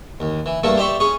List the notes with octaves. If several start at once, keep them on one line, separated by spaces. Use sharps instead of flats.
D#2
E3
G2 A3 A#3 A4 C#6
G4 C5 D5 E5 C#6
C#4 G#4 C#6